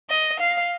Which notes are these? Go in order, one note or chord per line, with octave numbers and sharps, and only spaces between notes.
D#5
F5